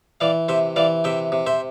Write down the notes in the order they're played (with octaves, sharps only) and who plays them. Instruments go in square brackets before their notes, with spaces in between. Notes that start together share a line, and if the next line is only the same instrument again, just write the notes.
[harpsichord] E3 D5 F5
C3 C5 E5
E3 D5 F5
C3 E5 G5
C3
C5 E5